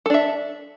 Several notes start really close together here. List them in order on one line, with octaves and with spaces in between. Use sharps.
A4 D4 E5